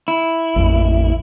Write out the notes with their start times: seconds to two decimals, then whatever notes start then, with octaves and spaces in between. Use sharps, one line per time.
0.08 E4
0.56 A1 F2